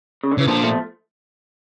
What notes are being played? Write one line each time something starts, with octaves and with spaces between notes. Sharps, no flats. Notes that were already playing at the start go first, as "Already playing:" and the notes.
C#3
D3
C#3 E3
A#2 D3 F3
F3 A3